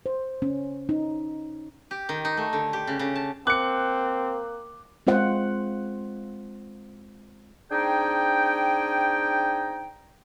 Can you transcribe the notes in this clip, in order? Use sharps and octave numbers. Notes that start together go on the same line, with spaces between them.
C5
C#4
D#4
G4
D#3
D#4
A3
D3
G4
C#3
C#3
A5
A#3 C4 D6 F#6 C#7
G#3 C4 F4 C5 F#5
C4 D4 D#4 G#4 G5